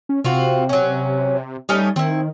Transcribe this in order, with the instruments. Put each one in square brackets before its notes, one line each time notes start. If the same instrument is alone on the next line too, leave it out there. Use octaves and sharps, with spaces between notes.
[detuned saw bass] C#4
[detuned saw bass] C3 [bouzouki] C4 F4 F#4
[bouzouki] F#3 C#4
[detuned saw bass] G3 [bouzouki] A3 C#4 D#4
[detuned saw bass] D#3 [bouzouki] C4 E4